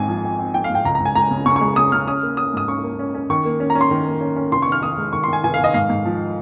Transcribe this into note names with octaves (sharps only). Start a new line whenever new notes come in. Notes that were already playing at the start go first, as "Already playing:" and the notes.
Already playing: G#1 G#2 C4 G#5
F3
C4
C4
F3 G5
F5
G#2
G5
C#2 A#5
A#5
C#2
G#5
C#2 A#5
C#3
C#3 C#6
C#6
G#3
C#3 D#6
C#3 F6
C#4 D#6
A#3
C#4 D#6
G#2 D#6
C#4 C#6
A#3
C#4
C#4
D#3 C#6
A#3
C#4
A#5
C#4
C6
D#3
A#3
C#4
C#4
F1 C6
C#6
D#3 F6
D#3 D#6
G#3
D#3 C#6
C6
D#3 G#5
F1 G#5
F5
D#3 D#5
G#2 F5
G#2
F3